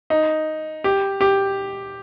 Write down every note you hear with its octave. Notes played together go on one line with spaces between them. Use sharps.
D#4
G4
G4